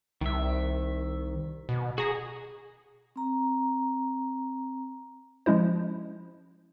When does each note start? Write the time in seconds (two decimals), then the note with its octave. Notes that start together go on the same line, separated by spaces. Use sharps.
0.21 C2 D#3 E5
1.69 B2
1.98 F#4 G#4 A#5
3.16 C4 A#5
5.46 F3 G#3 C#4 E4 C5